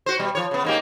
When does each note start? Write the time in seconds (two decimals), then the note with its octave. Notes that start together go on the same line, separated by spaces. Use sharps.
0.06 F#4 C5
0.19 B2 G3
0.35 F3 C#5
0.51 C#3 B3
0.65 G#2 A#3 G4